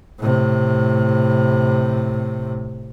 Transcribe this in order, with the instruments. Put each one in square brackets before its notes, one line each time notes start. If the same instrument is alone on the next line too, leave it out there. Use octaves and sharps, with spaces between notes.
[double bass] A2 C3